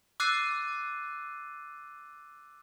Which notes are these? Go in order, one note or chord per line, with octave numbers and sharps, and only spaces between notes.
D6 E6 F#6 A6 C7 D#7